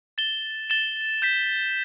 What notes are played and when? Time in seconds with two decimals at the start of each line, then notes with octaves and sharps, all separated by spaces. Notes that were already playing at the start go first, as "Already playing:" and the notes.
0.18 A6 E7 G7
0.70 A6 E7 G7
1.22 G6 B6 E7